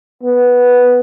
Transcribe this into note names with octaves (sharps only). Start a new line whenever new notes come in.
B3